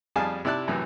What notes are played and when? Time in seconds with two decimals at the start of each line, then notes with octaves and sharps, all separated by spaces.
0.16 F2 G3 G#4 F5 G#5 A5
0.45 C3 E4 D5 A5 F#6
0.68 F#2 A2 C3 E3